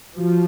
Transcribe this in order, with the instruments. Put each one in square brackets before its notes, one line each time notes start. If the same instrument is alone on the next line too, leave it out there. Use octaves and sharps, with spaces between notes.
[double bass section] F3 [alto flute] F#4